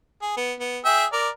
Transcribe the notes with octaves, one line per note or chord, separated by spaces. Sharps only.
G#4
B3
B3
G#4 E5 G5
A#4 D5